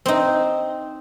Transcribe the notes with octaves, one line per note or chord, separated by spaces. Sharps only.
C4 D#4